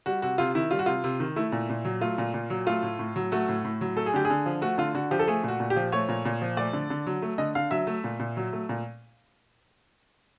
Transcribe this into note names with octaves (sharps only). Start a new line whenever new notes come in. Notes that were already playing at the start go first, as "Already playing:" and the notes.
G3 F#4
C3 F#4
C3 F4
D#3 E4
G3 F4
F#4
C3 F4
C3
D#3
A3 E4
A#2
A#2
F#3
A3 F4
A#2
A#2
F#3
A3 F4
A2
A2
F#3
A3 F#4
A2
A2
F#3
A3 A4
G#4
D3 G4
G#4
D3
F3
A3 F#4
D3 F4
D3 F#4
F3 G4
A4
A3 G#4
A#2 F#4
A#2
G4
F3
A3 C#5
A#2
A#2
F3
A3 D5
D3
D3
F#3
A3
D3 D#5
D3 F5
F#3 E5
A3
A#2
A#2
F#3
A3
A#2